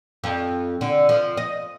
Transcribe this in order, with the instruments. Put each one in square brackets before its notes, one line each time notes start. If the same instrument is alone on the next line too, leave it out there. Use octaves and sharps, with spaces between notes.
[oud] F2
D3
F3
D#5